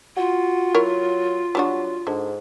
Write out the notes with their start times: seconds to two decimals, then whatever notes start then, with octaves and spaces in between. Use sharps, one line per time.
0.17 F4 F#4
0.75 F#3 E4 A#4 C#5
1.55 F#3 G3 D4 F#4
2.07 G#2 D3